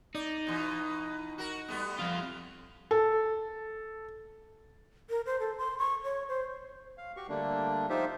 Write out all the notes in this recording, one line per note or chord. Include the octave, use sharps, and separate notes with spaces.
D#4 D5
B2 E3
F#4 A#4
G3 A3 B3
F2 F4
A4
A#4
C5
A4
C6
C#6
C#5
C5
F5
F#4 G4 C#6
D3 G3 A3 A#3 D4
F3 D#4 F4 G4 C5 E5